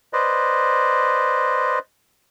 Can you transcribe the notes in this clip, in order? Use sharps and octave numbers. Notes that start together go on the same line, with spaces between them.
B4 C5 D5 D#5